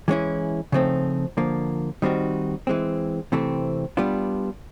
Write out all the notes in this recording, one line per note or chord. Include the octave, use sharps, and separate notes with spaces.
E3 G#3 C#4 E4
C#3 F3 A3 C4 D#4
D3 F3 A#3
D#3 G3 C4 D#4 F#4
E3 G#3 C4
C3 E3 A3 C4
G3 B3 D4 F4